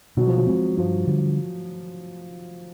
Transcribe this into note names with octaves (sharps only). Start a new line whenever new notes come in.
B2 F#3
F3
F#3
G#3 C4
G2 F3
D3 G3